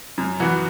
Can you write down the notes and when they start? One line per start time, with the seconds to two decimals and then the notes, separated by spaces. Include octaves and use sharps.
0.18 F#2
0.40 E3 B3 F#4